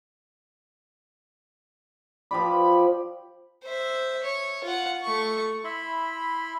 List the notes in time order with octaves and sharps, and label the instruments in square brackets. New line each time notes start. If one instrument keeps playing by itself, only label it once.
[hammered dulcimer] F3 G4 D5 [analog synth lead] B5
[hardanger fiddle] C5 E5
C#5
F4 F#5
A3 C#6
[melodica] E4 E5 B5 C6